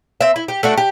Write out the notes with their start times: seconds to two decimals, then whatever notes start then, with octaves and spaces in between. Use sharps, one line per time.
0.21 C4 E5
0.36 E4
0.48 G4
0.63 A3 D4 F#4
0.77 G4